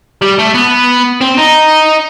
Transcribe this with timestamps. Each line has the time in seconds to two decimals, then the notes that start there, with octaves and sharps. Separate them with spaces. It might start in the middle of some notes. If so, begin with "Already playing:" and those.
0.22 G3
0.39 A3
0.55 B3
1.21 C4
1.38 D#4